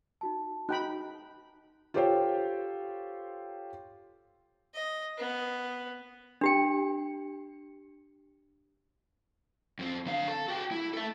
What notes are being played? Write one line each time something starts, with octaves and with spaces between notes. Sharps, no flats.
D#4 F#4 A5
D#4 F#4 G5 B5 F#6
F4 G4 A4 C5 C#5 G5
D#5
B3
D4 G4 G5
F2 C4
D3 F5
A4
F#4 G5
E4
A4 E5